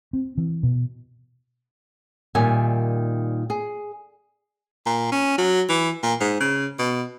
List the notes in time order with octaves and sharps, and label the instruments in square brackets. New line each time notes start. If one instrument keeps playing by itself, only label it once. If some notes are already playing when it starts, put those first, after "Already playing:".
[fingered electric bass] C4
E3
B2
[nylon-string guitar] A#2 D#3 G3 E5 G#5
G#4
[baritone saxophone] A#2
C#4
F#3
E3
A#2
G#2
C#3
B2